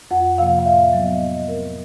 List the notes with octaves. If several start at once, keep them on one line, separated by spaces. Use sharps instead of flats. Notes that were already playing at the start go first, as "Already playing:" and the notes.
F2 F#5
C3 F3 A#3 F5
F5
A2 E5
E5
F#3 B3
D#5
C#3 D#5
F#3 A3 C4 A#4